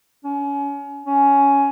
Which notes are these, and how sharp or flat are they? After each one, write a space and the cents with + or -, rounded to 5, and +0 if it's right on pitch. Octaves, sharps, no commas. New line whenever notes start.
C#4 +30
C#4 +10